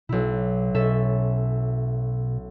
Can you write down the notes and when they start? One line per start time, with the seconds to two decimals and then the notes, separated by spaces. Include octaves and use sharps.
0.09 B1 B2 E4
0.75 B2 C#4 A4 E5